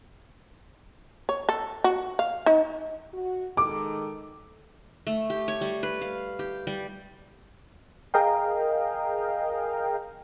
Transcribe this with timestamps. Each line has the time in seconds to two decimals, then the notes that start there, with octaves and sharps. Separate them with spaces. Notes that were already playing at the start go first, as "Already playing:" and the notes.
1.29 C#5
1.49 A4
1.84 F#4
2.19 F5
2.46 D#4
3.13 F#4
3.57 D#3 G#3 A4 D6
5.07 A3
5.30 G4
5.48 C#5
5.61 G3
5.83 B4
6.01 F5
6.39 G4
6.67 G3
8.14 G#4 A#4 D#5 F5 G5